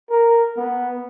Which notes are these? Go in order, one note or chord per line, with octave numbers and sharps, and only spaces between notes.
A#4
B3